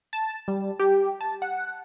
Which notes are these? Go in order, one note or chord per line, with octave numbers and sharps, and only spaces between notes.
A5
G3
G4
A5
F#5